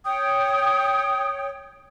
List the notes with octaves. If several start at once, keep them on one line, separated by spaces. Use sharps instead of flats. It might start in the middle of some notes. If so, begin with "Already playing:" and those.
C#5 G5 D#6